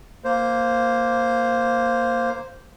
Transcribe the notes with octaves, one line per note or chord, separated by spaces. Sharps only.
A#3 C5